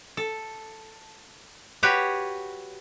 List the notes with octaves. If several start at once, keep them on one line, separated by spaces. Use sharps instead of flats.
A4
F#4 G4 B4 C#5